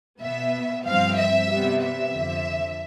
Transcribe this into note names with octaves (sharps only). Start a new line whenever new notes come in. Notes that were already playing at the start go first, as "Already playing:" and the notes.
B2 B3 E5
G2 F3 C4 F5
E5
C3 G3 B3
E5
F2 D3 F3